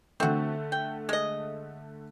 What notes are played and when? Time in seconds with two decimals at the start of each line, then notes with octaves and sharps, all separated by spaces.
0.20 D3 A3 C4 F#4
0.72 G5
1.09 G#3 D#5